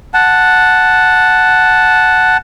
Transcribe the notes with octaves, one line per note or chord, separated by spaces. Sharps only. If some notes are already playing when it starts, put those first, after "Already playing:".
F#5 A5